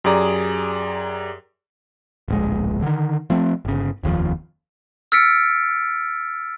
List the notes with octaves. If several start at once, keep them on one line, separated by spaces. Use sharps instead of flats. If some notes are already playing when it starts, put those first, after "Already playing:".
F#2 G4 G#4 D5 A#5
D1 A#1 G#3
D3 D#3
F3 A3 C4
G1 C#3
F1 D#2 B2 F3
E6 F6 A6 B6 C#7 D7